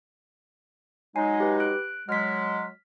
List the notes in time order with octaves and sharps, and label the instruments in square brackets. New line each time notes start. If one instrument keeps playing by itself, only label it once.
[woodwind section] F#3 G#3 D#4 [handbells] G#5 C7
[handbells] G4 B4
F#6 D7
[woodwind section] F#3 G#3 [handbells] F6 B6